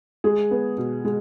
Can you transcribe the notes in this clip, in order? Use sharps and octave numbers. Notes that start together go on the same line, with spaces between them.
G#3 G#4
B3
B2
G#3